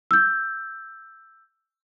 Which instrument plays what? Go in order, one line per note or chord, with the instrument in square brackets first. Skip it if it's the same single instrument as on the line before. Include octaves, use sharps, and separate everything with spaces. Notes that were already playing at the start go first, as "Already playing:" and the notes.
[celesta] E6 G6